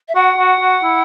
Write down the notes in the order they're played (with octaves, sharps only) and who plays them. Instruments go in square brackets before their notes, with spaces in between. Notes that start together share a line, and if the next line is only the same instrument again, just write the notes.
[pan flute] E5
[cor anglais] F#4 [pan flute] F#5
[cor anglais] F#4
F#4
E4